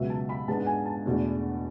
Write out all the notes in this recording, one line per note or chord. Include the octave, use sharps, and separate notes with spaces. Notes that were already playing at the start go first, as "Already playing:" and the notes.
Already playing: C#2 B2 F#3 B3 E5
A5
B5
G#2 G#3 B3 D4 A5
F#5
G#5
A5
E2 B2 A3 D4